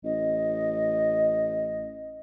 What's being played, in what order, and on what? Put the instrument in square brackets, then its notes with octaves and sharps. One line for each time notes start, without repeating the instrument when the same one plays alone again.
[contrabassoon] A1 [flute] D#5